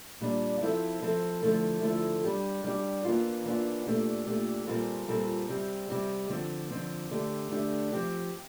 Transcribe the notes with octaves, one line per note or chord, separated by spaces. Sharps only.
A#2 G3 D4
F3 C4 E4 A4
F3 C4 E4 A4
D3 F3 A3 E4 A4
D3 F3 A3 E4 A4
G3 D4 G4
G3 D4 G4
E3 A#3 D4 F4
E3 A#3 D4 F4
A#2 A3 D4 G4
A#2 A3 D4 G4
A#2 G3 C4 F4 A4
A#2 G3 C4 F4 A4
C3 G3 C4 G4
C3 G3 C4 G4
D3 F3 C4
D3 F3 C4
D3 A3 D4 G4
D3 A3 D4 G4
F3 C4 G4